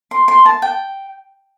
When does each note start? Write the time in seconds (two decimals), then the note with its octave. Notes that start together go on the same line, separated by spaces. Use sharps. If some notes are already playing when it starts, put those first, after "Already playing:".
0.11 C6
0.28 C6
0.45 A5
0.62 G5